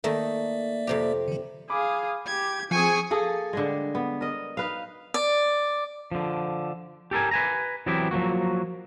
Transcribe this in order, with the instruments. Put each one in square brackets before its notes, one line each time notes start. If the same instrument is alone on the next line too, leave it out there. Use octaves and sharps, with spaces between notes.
[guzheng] D#3 A3 D#4 [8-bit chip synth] A#3 D5 E5
[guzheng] F2 C3 G4
[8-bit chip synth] D3 F3
[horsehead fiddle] G#4 F5 [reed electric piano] B5 D6
[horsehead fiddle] G4 [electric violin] G#6
[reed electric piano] F3 [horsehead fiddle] C4 G#4 [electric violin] G#5 C#6
[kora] A#3 G#4 A4
D3 G3 G#3
B3
A#4 D#5
D#4 B4 F5
[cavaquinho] D5
[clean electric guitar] D3 F3
G4 A4 A#4 G#5
B4 G#5 A#5
E3 F#3 B3 C4 E4 G4
F3 F#3 A#3 F#4